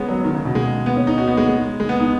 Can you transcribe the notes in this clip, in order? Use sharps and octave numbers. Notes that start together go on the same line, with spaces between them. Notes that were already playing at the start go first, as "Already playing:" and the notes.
Already playing: G#3 B3 C#4
F#3
D#3
C#3
B2
G#3
B3
C#4
D#4
F#4
B3
G#3
G#3
G#3
B3
D#4